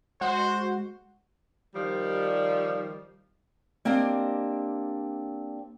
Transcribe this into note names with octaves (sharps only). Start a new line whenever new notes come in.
G#3 F#4 C5 F#5
D#3 F3 G3
A#3 C4 D4 G4 D#5